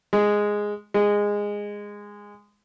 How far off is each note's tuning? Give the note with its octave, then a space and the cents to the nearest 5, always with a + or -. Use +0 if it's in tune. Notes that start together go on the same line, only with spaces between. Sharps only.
G#3 -5
G#3 -15